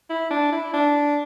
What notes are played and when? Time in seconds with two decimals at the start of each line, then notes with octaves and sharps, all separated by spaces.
0.10 E4
0.31 D4
0.52 E4
0.74 D4